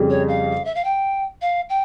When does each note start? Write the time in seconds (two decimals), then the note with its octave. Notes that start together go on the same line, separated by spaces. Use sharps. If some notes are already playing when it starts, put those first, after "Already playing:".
Already playing: F2 C#3 G3
0.10 C#5
0.28 F5
0.65 E5
0.75 F5
0.84 G5
1.41 F5
1.69 G5